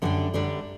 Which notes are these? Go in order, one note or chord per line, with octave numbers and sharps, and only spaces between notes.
F#2 D3 G3 D4 G4
F#2 D3 G3 D4 G4